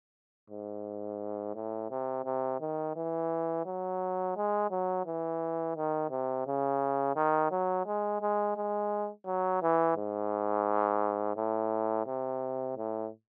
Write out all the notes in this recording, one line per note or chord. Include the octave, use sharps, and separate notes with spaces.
G#2
A2
C3
C3
D#3
E3
F#3
G#3
F#3
E3
D#3
C3
C#3
D#3
F#3
G#3
G#3
G#3
F#3
E3
G#2
A2
C3
A2